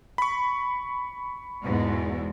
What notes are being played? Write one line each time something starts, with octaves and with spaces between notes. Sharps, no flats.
B5 C#6
E2 G#2 B2